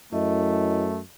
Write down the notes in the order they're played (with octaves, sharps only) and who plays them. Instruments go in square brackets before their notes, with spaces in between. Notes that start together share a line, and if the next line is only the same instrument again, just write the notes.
[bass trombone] F#2 [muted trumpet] A3 [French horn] E4 [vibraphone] D#5